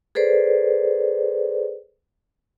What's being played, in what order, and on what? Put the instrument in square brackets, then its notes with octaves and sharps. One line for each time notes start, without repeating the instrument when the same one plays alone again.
[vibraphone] G#4 A4 B4 C5 D5